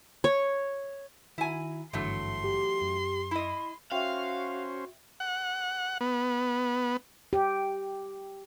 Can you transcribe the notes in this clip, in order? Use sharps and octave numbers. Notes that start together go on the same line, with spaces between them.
C#5
D#3 E4 F#4 G#5 A#5
G#1 G2 D3 E3 F#3 A3 C6
G4
F#2
E4 D#5 B5
C#4 F#4 C5 E5 F5 G5
F#5
B3
G4